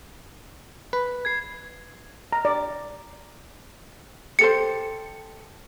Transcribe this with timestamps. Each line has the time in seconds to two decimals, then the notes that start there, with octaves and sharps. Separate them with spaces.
0.93 B4
1.25 G#6 C7
2.32 A#5
2.45 D5
4.39 G4 A4 C5 C#7